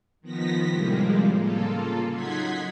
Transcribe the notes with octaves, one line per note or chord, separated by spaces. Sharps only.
D#3 F3 B3 A#6 B6
A2 C3 F3 G3 G#3 A#3
C#3 A#3 F4 A4
F#3 D#4 F#5 C6 G#6 B6